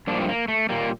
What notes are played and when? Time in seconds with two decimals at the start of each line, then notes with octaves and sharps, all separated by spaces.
0.07 G2 F3 A#3 D4
0.21 C4
0.28 A#3
0.48 A3
0.69 A#2 G3 A#3